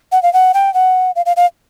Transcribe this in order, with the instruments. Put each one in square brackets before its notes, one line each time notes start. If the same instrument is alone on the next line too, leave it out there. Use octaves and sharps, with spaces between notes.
[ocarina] F#5
F5
F#5
G5
F#5
F5
F5
F5